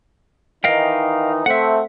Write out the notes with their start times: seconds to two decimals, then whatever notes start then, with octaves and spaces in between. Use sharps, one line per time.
0.64 D#3 E3 D#4 D#5 F5 G5
1.46 A3 C4 E5 F#5